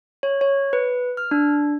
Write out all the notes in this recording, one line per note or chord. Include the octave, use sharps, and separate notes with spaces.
C#5
C#5
B4
F6
D4